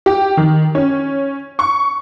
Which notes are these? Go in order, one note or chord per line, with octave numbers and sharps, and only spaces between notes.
G4
D#3
C#4
C#6